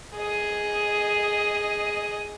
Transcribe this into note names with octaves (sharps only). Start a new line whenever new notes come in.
G#4 D#5